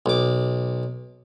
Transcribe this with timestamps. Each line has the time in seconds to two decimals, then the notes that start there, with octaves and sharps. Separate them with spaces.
0.06 B1 D6